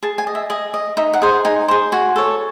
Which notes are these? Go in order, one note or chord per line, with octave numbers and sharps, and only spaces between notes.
G#4 A5
G#5
D#5
E5
G#4 D#5
D#5
D#4 E5
F#5
G#4 C5
D#4 G#5
G#4 C5
F#4 G#5
A4 C#5